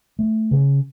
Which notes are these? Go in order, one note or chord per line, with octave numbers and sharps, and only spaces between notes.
A3
C#3